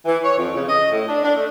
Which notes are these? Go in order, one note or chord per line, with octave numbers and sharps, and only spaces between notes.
E3
C#5
F2
C#3
D#5
A2
D4
D4
A3